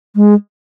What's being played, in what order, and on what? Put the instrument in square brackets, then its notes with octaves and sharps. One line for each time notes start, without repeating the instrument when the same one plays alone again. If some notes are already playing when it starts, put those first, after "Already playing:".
[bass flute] G#3